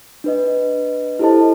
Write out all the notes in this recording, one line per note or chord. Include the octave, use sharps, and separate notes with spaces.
D4 B4 D#5
E4 G4 A4 C5 D#5 A5